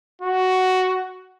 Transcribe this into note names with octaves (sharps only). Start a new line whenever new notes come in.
F#4